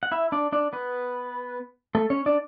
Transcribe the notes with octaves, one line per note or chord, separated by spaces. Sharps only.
F#5
E4 E5
D4 D5
D4 D5
B3 B4
A3 A4
C#4 C#5
D4 D5